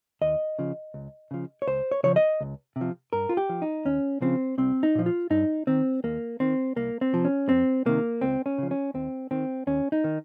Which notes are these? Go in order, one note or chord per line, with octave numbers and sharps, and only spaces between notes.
D#2 D#5
C#3 F3
C#2
C#3 F3
C#5
C#2 C5
C#5
C#3 F3 C#5
D#5
C#2
C3
F3
G2 A#4
F4
G4
F3
D#4
D#2 C#4
C#3 F3 C4
C2 C4
D#4
A#2 F3
F4
G2 D#4
D#3 C4
D#2 A#3
D#3 C4
C2 A#3
C4
C3 F3
C#4
F2 C4
C3 D#3 A#3
C#2 C4
C#4
C#3 F3
C#4
D#2 C4
D#3 C4
D#2 C#4
D#4
D#3